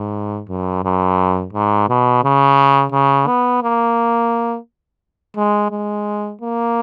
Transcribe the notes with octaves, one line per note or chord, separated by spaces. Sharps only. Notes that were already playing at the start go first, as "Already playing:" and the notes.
Already playing: G#2
F#2
F#2
G#2
B2
C#3
C#3
B3
A#3
G#3
G#3
A#3